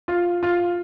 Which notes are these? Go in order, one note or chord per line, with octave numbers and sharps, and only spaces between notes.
F4
F4